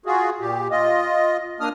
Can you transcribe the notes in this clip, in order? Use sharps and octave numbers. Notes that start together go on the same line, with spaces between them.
F4 F#4 G#4
A#2 G4
F4 D#5
A#3 D4 D#6 F6